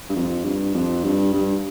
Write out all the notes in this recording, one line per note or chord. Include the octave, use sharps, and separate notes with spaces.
G2
F2
G2
F2
G2
G2